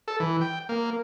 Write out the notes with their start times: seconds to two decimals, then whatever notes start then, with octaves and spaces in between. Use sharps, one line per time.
0.08 A4
0.20 E3
0.41 G5
0.69 A#3